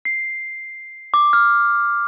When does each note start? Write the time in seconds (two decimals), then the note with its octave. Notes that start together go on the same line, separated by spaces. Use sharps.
0.05 C7
1.14 D6
1.33 F6